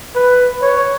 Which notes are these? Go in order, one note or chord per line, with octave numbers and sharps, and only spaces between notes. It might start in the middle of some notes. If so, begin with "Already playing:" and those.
B4
C#5